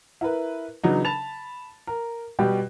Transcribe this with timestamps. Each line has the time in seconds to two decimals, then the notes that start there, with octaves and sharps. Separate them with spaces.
0.21 E4 A#4 B4
0.84 C#3 E3 F#3 B3 D4 D#4
1.05 A5 B5 A6 F7
1.87 A#4
2.39 B2 G3 F#4 G4